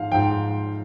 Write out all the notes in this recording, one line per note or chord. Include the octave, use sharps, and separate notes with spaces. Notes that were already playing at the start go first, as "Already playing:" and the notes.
Already playing: G#2 F3 F5
G#2 F3 G5